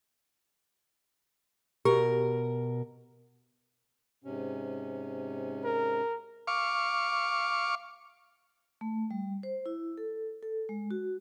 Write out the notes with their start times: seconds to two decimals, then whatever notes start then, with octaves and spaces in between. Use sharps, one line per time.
1.85 B2 G4 A#4
4.24 G#2 C3 C#4
5.64 A#4
6.47 F5 C#6 D6
8.81 A3
9.11 G3
9.43 C5
9.66 E4
9.98 A4
10.43 A4
10.69 G#3
10.91 F#4